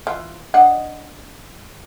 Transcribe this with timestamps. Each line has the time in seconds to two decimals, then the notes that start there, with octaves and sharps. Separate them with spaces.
0.07 E3 F4
0.54 D4 D#5 F#5